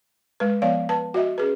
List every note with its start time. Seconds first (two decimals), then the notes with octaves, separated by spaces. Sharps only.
0.40 G#3 B4
0.62 F3 B3 C#5 D5 F5
0.89 B4 A5
1.14 F#4 D#5 E5
1.38 C#4 G#4 B4